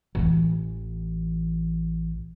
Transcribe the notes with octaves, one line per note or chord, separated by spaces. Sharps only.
A1 E3